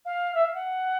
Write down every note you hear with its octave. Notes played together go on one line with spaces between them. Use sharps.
F5
E5
F5
F#5